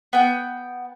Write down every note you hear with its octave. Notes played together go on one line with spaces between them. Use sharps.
B3 G5